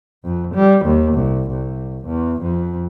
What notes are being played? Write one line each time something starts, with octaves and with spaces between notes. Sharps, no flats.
F2
G3
D#2
C2
C2
E2
F2